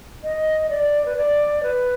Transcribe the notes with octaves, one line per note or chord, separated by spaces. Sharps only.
D#5
D5
B4
D5
B4